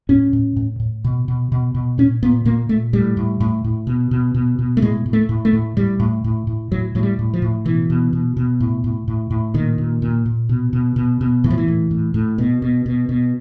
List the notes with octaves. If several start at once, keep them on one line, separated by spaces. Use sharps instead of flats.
A2 C#4
A2
A2
A2
B2
B2
B2
B2
A#2 C#4
A#2 B3
A#2 A#3
A#2 A3
A2 G3
A2
A2
A2
B2
B2
B2
B2
A3
A2 G#3
A2
A3
A2
A3
A2
A2 G3
A2
A2
A2
A2 F#3
A2 F#3
G3
A2
F3
A2
B2 E3
B2
B2
B2
A2
A2
A2
A2
A#2 D#3
A#2
A#2
A#2
B2
B2
B2
B2
A2 E3
F3
E3
A2
A2
A2
B2
B2
B2
B2